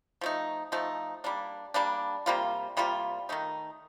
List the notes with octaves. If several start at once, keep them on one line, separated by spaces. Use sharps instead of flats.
F3 A3 D#4
F3 A3 D#4
G3 A#3 D4
G3 A#3 D4
C3 G3 A#3 F4
C3 G3 A#3 F4
D#3 A3 D#4